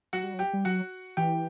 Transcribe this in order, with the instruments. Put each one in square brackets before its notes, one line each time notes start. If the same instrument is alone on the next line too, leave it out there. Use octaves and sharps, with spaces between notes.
[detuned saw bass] F#3 [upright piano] F#4 F#5
[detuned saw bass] G3
F#3
[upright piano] G4 G5
[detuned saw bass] G3
[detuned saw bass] F#3 [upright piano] F#4 F#5
[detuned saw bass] E3 [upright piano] G4 G5